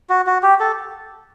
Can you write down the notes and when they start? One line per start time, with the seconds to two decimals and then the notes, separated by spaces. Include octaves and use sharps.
0.10 F#4
0.26 F#4
0.43 G4
0.60 A4